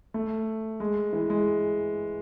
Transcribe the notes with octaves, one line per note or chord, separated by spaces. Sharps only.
A3
G#3
E3
G#3